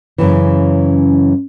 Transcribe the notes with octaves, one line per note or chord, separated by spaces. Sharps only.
F#2 C#3 E3